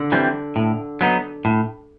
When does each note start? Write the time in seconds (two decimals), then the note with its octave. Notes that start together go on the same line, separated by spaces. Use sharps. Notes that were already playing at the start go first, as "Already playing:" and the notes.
Already playing: D3
0.12 E3 G3 C4
0.56 A2
1.01 F#3 B3 D#4
1.45 A2